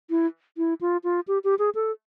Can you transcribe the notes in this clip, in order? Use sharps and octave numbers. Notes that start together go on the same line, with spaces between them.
E4
E4
F4
F4
G4
G4
G#4
A4